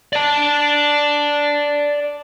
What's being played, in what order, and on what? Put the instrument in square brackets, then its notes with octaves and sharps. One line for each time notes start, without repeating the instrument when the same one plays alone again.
[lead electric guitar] D5 A5